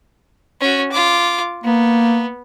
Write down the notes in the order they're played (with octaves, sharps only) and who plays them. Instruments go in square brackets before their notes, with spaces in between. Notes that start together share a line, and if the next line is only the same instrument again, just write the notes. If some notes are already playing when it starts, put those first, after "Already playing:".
[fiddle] C#4 F#4
F4 D6
[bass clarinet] A#3 [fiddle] B3